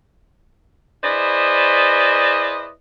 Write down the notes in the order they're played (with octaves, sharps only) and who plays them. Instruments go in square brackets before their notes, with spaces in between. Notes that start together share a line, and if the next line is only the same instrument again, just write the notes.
[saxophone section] E4 G#4 B4 C5 D5 D#5